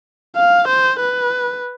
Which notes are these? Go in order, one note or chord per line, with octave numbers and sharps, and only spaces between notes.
F5
C5
B4